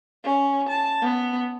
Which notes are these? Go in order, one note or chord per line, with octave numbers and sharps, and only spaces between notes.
C#4
A5
B3